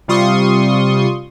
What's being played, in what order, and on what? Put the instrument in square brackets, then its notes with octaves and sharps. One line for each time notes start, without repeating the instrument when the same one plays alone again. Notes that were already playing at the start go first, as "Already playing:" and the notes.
[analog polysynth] C3 G3 F4 C6 C#6 D#6